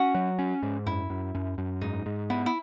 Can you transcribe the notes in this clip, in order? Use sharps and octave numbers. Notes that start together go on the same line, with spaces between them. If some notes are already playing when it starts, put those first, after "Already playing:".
Already playing: C#4 F#4
F#3
C#4
G#2
F#2 E4
F#2
F#2
F#2
G#2 D#4
G#2
B3 E4
E4